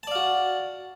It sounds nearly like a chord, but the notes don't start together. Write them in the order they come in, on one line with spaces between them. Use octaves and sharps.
A5 D5 F5 F#4